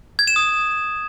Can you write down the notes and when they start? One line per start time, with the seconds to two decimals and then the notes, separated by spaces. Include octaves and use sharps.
0.19 G#6
0.27 E7
0.36 D#6